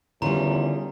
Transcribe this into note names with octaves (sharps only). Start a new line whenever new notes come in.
E2 D3 D#3 G3 C#4 F4 A#5